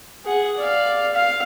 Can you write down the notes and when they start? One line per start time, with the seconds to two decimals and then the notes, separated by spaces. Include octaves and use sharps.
0.25 G#4 F#5
0.57 D5 F5
1.14 F5